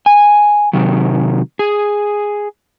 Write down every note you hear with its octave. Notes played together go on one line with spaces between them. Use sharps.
G#5
C3 D#3 F#3
G#4